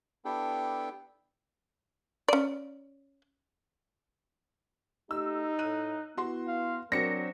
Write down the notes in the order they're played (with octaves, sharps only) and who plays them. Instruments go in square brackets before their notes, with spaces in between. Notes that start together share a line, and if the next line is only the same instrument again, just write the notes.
[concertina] B3 D4 E4 G4 A4 G5
[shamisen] C#4 D5
[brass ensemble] A3 G4 [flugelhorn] D#4 [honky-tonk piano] E6
[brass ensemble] A2 [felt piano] F#6 D#7
[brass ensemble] B3 E4 [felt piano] F#4 C6
[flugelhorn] F5
[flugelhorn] F#3 [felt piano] C4 D4 C5 [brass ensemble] F#4 A#4 [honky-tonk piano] A#6 C#7